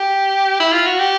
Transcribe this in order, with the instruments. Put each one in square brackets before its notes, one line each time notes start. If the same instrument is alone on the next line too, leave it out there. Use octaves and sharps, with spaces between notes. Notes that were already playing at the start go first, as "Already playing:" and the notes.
Already playing: [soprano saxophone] G4
E4
F4
F#4
G4